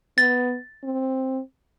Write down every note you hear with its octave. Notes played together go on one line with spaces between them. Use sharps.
B3 A6
C4